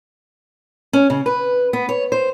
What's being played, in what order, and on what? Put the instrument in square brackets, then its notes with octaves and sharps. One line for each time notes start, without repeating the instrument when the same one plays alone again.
[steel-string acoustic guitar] C#4
C#3
B4
B3
C#5
C5